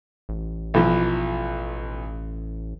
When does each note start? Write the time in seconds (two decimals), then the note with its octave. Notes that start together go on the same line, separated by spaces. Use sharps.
0.29 A1
0.74 B1 E3 F3